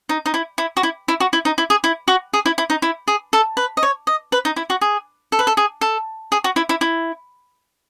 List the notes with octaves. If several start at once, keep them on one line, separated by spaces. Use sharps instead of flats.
D#4
D#4
E4
E4
F#4
E4
E4
F#4
E4
D#4
E4
G#4
E4
F#4
G#4
E4
E4
D#4
E4
G#4
A4
B4
D#5
C#5
D#5
B4
D#4
E4
F#4
G#4
A4
B4
A4
G#4
A4
G#4
F#4
E4
E4
E4